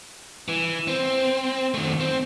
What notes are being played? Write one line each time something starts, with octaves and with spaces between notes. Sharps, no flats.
E3
C4
D#3 A3
C4